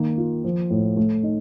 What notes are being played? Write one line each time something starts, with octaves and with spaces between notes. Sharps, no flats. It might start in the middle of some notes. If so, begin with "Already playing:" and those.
Already playing: D#3 A#3
F4
F3
A2
A3
D#4